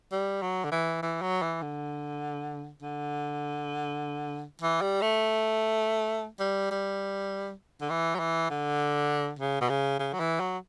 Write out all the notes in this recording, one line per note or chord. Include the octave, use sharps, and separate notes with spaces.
G3
F#3
D3
E3
E3
F#3
E3
D3
D3
E3
G3
A3
G3
G3
D3
E3
F#3
E3
D3
C#3
B2
C#3
C#3
F#3
E3
F#3